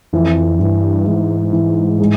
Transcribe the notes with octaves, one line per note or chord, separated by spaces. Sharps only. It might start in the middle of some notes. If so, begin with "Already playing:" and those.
F2 E3
G2 E3
G#2 E3
E3
G#3